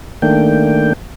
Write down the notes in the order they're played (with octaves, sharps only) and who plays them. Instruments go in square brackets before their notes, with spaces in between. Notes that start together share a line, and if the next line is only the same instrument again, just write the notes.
[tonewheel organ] D#3 A3 A#3 D4 G5